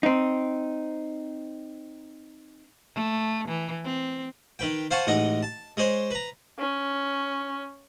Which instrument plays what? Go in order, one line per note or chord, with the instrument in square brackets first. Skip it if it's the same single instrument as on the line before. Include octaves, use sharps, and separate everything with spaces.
[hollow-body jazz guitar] C4 D#4
[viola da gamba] A3
E3
C4
[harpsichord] D#3 B4 G5
C5 F5 F#5 G#5 A5 C#6
A1 G#3 D#4 D#5 F#5
A5
G#3 G#4 C5 C#5
B4 A#5
[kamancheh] C#4